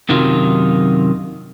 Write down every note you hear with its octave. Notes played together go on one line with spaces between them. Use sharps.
F#2 C3 D#3 F#3 D#4 F4